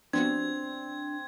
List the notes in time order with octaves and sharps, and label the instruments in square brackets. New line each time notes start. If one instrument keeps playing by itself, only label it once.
[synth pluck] F3 B3 F#4 [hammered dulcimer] C4 [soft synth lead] D4 [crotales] G#6